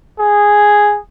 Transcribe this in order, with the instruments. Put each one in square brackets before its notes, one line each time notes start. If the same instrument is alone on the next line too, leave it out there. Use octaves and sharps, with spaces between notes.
[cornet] G#4